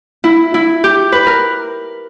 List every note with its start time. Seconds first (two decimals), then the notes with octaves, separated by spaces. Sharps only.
0.24 E4
0.54 E4
0.84 G4
1.12 B4
1.27 A#4